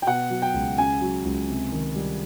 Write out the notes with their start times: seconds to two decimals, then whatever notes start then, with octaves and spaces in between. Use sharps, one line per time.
0.02 G5
0.06 B2 F#5
0.30 F#3
0.42 G5
0.54 C#2
0.78 C#3 G#5
1.01 F#3
1.24 C#2
1.49 C3
1.72 D#3
1.96 G3